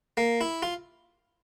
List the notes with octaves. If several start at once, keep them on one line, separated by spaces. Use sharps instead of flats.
A#3
E4
F4